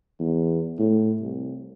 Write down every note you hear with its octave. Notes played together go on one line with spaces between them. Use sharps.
E2
A2
C2